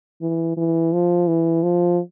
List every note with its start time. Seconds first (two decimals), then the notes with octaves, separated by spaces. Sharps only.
0.22 E3
0.57 E3
0.93 F3
1.28 E3
1.63 F3